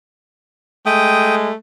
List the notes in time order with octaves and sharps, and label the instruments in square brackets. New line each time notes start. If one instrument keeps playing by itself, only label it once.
[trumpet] G#3 [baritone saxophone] A3 [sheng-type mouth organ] G5 D#6